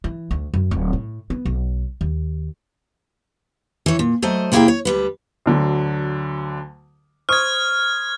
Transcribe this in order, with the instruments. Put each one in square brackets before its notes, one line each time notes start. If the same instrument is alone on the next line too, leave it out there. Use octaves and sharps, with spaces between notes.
[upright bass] E3
D2
F#2
D1
A2
B3
B1
D#2
[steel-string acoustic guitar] E3 C#5
A#2
F#3 A3 C5 D#5
C3 A#3 E4 G4 G#4 G5
C#5
D2 G3 B4
[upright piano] D2 D3 F#3
[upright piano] C5 C#6 D#6 [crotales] F6 G#6